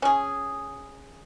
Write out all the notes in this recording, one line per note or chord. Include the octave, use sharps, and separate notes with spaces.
C#4 G#4